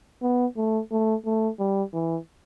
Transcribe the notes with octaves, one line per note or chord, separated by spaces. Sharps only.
B3
A3
A3
A3
G3
E3